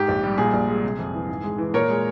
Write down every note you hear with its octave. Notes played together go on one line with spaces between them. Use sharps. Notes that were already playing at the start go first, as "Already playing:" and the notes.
Already playing: G#2 G4
A#1
G3
A#2 G#4
A#1
G#3
C3
F2
E3
G#2
G#3
E3
A#2 A#4 C#5
G#3